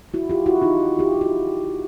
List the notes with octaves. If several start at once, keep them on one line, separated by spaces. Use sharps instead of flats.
E4 F#4
F4 G4
E4 F#4
D#4 F4
F4 G4
F4
E4 F#4